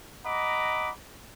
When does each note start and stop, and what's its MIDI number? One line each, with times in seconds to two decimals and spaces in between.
0.25 0.91 75
0.25 0.91 78
0.25 0.91 82
0.25 0.91 83
0.25 0.91 86